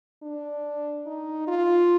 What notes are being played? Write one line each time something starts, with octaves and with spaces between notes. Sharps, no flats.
D4
D#4
F4